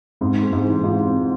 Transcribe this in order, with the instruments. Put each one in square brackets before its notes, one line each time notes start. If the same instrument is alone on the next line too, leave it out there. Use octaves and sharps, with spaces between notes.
[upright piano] G#2 [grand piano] C4
[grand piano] G#3
[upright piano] G#2
[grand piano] E3
[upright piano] G#2 [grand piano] F4
[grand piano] C4